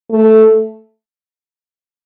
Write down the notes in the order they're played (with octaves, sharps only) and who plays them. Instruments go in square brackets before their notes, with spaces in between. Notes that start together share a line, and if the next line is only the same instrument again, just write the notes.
[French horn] A3